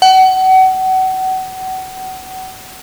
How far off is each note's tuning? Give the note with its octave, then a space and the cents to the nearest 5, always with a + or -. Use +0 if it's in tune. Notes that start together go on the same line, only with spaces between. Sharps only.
F#5 +30